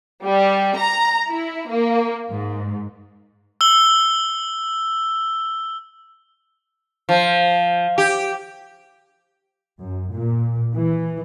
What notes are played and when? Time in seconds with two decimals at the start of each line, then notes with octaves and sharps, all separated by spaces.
0.24 G3
0.76 A#5
1.30 E4
1.70 A#3
2.32 G#2
3.61 E6 G7
7.09 F3
7.98 G4
9.83 F#2
10.14 A#2
10.75 E3